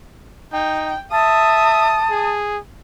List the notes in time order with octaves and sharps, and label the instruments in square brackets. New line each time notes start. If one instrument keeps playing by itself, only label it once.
[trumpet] D#4 [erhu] G5
[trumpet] E5 [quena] A5 [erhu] D#6
[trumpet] G#4